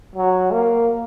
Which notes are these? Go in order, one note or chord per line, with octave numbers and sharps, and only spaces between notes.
F#3
A#3